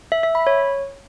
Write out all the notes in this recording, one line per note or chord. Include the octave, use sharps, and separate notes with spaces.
E5
E5
B5
C#5